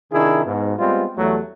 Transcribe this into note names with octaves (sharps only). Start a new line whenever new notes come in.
C3 D#3 D4 E4 G#4
G#2 B2
G3 G#3 B3 C4 F4
E2 F#3 G3 A3